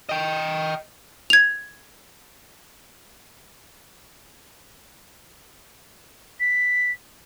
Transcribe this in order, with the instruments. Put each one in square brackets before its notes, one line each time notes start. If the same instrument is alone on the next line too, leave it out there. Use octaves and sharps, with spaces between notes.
[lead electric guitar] D#5 G5
[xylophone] G#6 F7
[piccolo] B6